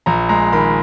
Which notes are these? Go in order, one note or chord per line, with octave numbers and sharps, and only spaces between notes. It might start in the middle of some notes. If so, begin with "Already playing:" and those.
A#1 A#5
G#3 A#5
D#3 B5